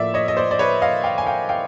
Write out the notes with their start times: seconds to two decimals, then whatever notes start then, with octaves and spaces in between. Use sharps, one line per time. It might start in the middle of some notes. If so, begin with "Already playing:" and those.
Already playing: A2 F3 A#3 D5 E5
0.14 C#5 D#5
0.28 D#5
0.37 C5 D5
0.51 D5
0.59 B4 C#5
0.82 D#5 F5
1.04 F5 G5
1.18 G#5
1.27 F5 G5
1.49 F5 G5